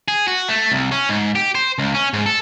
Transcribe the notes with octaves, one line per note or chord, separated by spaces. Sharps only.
G#4
F#4
A3
C2
C#4
G#2
G4
C5
C#2
C#4
G#2
A4